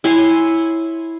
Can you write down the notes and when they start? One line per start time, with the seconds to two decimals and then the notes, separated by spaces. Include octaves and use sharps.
0.04 E4 C#5 G#5 C6